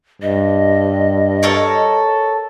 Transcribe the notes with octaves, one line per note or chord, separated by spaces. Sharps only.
G2 D#5
A4 A#4 C#5